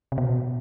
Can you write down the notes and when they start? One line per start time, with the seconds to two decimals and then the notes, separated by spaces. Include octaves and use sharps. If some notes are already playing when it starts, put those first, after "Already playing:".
0.12 C3
0.18 B2